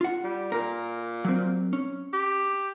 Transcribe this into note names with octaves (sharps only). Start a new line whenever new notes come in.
F4 F#5
G3
A#2 A#4
F#3 C4
C#4
G4